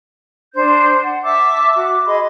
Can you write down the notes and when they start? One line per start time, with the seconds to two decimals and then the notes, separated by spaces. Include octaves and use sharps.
0.55 D4 C5 G6
1.04 F#5
1.23 E5 A5 D6 E6
1.75 F#4 D6
2.06 G#4 D#5 B5 C6